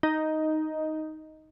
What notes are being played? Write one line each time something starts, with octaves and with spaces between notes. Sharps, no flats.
D#4